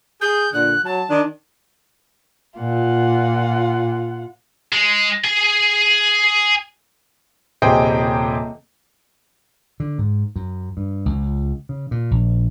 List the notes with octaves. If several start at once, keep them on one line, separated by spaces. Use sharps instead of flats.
G#4 G6
A#2 D3 F#6
F#3 A5
D#3 D4
A#2 F4 F#5
G#3
G#4 G#5
D#1 C3 G#4 C5 D#5 G5
D3
G#2
F#2
G2
C#2
C#3
A#2
A#1